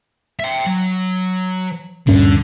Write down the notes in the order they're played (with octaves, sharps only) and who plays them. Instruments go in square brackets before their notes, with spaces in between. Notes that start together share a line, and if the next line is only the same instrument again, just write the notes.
[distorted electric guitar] E5 G5
F#3
[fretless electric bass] D#1 G2 C#4 [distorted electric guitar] D3